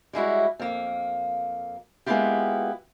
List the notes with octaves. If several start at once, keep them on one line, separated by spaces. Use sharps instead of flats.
G3 G#3 E4 F#4
F2 A#3
G#3 A#3 B3 E4 F4 G4